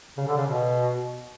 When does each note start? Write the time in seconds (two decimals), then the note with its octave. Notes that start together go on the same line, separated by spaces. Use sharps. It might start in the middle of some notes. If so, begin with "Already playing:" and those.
0.17 C#3
0.27 D3
0.37 C#3
0.47 B2